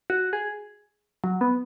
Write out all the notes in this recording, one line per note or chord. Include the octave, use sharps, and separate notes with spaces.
F#4
G#4
F#3
B3